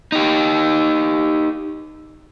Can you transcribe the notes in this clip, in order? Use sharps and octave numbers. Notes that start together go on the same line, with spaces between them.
D#4 G4